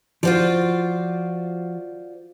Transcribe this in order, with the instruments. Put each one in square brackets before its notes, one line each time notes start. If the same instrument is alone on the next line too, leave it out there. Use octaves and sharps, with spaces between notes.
[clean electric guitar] F3 F#4 [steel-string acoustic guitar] F4 C5 D5